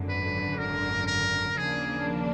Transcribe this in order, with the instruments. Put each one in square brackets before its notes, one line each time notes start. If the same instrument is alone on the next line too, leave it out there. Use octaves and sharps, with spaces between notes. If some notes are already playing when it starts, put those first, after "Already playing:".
Already playing: [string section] G#1 F#2 D3
[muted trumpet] B4
A#4
A#4
[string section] D#2 C#3 F3 A#3 D4 [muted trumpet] G#4